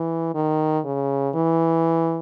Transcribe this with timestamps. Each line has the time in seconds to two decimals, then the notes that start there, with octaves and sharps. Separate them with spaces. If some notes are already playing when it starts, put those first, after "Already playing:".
Already playing: E3
0.34 D#3
0.85 C#3
1.35 E3